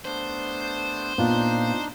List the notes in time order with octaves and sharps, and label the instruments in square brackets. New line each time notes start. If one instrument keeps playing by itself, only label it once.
[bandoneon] A3 B3 D4 [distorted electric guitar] C5
[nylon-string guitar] A#2 [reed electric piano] B3 F4 [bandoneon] D4 D#4